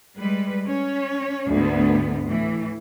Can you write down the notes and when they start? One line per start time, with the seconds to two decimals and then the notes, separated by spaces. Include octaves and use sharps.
0.17 G3 G#3 B4
0.67 C#4 C#5
1.50 D2 G#2 D3 B3
2.24 A2 E3